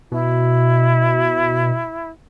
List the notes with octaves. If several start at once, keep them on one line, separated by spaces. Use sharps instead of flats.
B2 E4